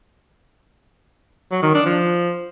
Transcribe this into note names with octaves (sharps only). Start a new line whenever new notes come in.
F#3
D#3
D4
F3